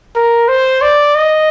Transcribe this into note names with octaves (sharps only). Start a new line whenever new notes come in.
A#4
C5
D5
D#5